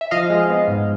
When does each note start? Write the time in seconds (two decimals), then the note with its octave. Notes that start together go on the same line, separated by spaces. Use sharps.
0.01 E5
0.11 F3 D#5 F5
0.30 G#3
0.50 B3
0.68 G#2